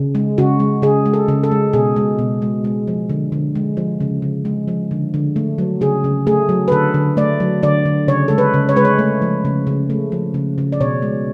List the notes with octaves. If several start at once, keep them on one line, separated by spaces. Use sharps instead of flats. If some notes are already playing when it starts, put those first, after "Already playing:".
Already playing: C#3
G#3
C#3 F#4
G#3
C#3 G#4
G#3
A4
C#3
A4
G#3
B2 G#4
G#3
B2
G#3
G#3
F3
D3
D3
G#3
F3
C#3
C#3
G#3
F3
D3
D3
A3
F#3
C#3 G#4
C#3
A3 G#4
F#3
B4
D3 A4
D3
A3 D5
F#3
D3 D5
D3
C#3 C#5
G#3 A4
B4
C#3
C#5
G#3 B4
C#5
A3
F3
C#3
C#3
A3
F3
C#3
C#3
D5
B2 C#5
G#3